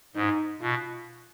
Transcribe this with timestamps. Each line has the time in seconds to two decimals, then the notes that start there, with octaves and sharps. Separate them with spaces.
0.15 G#2 D#4
0.60 B2 F4